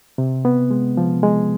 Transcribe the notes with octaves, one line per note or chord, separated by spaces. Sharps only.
C3
B3
G#3
F3
G#3